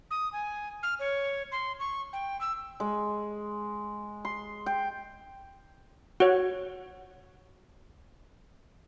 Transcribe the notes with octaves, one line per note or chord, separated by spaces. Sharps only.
D#6
G#5
F6
C#5
C6
C#6
G5
E6
G#3
C6
G5
F#4 C#5